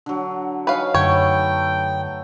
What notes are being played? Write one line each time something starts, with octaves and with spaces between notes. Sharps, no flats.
D3 F#3
D#4 B4 C#5 F5 G#5
F#2 D3 A3 B4 C#5 F#5 G5